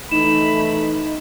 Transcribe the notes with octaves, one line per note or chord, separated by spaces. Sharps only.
E3 A3 D#4 B5 E7